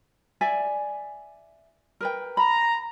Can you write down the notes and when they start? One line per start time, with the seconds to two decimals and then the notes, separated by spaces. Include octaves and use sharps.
0.41 D5 E5 G#5
2.01 A#4 B4 G5
2.37 A#5 B5